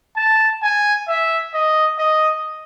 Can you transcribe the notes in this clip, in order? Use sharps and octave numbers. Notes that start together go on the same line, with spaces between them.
A5
G#5
E5
D#5
D#5